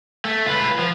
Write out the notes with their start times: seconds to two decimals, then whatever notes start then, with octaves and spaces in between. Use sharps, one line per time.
0.25 A3
0.46 F4 B4
0.79 F3